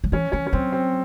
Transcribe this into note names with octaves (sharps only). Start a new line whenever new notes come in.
F#3
E3 C#4
E3 C#4
C#4
F#3 C4
C4